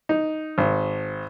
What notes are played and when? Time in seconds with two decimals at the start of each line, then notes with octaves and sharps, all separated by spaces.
0.09 D#4
0.58 G#1